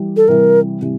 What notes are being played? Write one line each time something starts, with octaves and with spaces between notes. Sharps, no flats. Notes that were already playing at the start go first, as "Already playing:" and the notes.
Already playing: E3 G3
A4
C3 E3 G3 A#4
C3 E3 G3